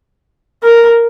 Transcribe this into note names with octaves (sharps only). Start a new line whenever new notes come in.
A#4